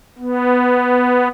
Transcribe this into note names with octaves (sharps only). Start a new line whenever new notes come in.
B3